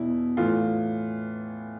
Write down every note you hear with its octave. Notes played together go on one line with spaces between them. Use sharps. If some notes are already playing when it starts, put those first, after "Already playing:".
Already playing: E2 B2 E4
A2 E3 F4